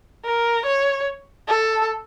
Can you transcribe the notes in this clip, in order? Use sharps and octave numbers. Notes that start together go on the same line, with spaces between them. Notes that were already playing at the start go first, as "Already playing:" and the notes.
A#4
C#5
A4